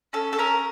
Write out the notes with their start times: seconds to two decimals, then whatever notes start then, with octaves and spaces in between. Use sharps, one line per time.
0.13 C#4 A4
0.33 A4
0.38 C#4 A#4